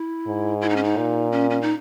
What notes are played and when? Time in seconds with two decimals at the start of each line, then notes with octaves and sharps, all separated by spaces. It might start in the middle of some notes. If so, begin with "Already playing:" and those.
Already playing: E4
0.27 G#2
0.61 E4
0.69 D#4
0.76 C#4
0.84 D#4
0.98 A#2
1.32 C#4
1.50 C#4
1.62 D#4